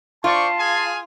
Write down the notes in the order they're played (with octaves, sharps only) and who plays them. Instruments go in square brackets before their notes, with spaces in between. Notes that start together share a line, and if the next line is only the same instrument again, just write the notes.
[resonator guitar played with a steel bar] F4 [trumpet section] C5 D5 C#6 [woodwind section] A5 C6
[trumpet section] G#4 F5 G#5